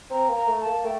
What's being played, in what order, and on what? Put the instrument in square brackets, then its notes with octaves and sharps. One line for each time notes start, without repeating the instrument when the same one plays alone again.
[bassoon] C4 [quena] A#5
[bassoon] A#3
[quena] A#5
[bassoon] A3
[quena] A5
[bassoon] A#3
[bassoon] A3 [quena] G5